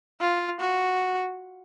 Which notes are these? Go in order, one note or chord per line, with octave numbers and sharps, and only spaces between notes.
F4
F#4